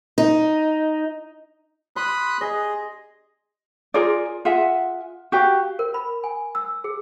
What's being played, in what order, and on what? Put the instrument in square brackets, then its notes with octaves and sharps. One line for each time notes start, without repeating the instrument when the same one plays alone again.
[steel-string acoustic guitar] D#4
[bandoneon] B5 D#6 F#6 [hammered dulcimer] C6
[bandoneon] G#4 [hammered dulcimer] D#5
[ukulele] F4 G#4 A#4 D5
F4 G#4 E5 F#5
F#4 G4 F5
[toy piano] A#4
B5
G#5
E6
G#4